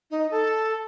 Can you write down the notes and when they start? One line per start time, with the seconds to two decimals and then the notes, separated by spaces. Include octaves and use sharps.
0.11 D#4
0.31 A4